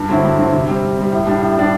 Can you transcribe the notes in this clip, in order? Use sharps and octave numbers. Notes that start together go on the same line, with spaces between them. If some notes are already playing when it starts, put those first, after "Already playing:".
Already playing: G2
D3 F#3 C4 E4
G2
D3 F#3 C4 E4
C3
G3 C4
C3
G3 C4
A2
G3 D4
A2
G3 D4